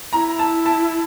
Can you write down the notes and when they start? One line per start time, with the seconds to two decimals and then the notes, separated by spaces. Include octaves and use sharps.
0.13 E4 A#5
0.39 A5
0.66 A5